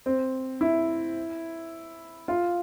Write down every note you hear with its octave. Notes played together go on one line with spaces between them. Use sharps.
C4
E4
F4